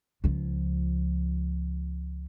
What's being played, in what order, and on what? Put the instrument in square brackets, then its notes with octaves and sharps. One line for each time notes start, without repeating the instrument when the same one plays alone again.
[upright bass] C#2 F3